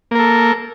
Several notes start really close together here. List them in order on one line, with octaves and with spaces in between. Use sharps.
A#3 A#4 A4